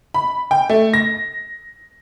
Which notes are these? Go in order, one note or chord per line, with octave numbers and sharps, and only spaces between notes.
B5
G5
A3
A#6